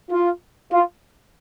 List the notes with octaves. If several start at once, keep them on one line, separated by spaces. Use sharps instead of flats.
F4
F4